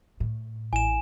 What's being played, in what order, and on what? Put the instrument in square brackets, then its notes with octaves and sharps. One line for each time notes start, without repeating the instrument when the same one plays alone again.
[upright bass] A2
[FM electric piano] A1 [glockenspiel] G#5 E7